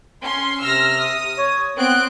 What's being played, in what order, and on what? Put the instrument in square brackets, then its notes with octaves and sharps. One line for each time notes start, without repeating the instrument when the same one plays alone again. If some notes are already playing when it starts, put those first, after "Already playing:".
[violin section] C#4 C6
[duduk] C3 [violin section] E6 F6 A#6
[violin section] D#6
[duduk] C#5
[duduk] B3 [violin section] C4 F#6 D7